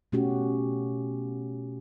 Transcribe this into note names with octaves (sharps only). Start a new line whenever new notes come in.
B2 A3 C#4 F#4 G4